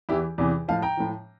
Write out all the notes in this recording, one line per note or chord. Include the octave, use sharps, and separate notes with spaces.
E2 E3 E4 G4
E2 C3 E3
A2 F3 F5 A5
G5 A#5
A2 F3